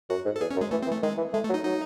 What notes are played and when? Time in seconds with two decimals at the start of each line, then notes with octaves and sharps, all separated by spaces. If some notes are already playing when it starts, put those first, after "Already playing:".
0.10 F#2 F#4
0.25 G#2
0.36 A4
0.41 E2 G#4
0.51 C#4
0.57 F#2
0.61 G#3
0.71 E3 A3
0.83 C4
0.87 E3
0.92 A3
1.03 D#3 G#3
1.18 E3
1.33 G#3 A3
1.44 A3
1.50 F#3
1.54 D#4
1.64 F#3 D#4